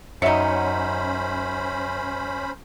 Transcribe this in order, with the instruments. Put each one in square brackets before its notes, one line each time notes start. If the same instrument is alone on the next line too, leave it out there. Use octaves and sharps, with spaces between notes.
[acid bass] F#2 [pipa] F#3 D#4 [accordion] C#4 C5 B5 [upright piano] E5 C#7